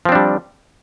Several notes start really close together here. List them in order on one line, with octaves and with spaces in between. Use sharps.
F3 C4 D4 G3